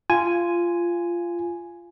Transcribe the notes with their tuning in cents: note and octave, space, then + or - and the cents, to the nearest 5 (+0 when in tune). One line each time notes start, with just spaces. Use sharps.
F4 -15 G#5 +0